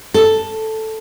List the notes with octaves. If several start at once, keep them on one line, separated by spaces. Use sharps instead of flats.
A4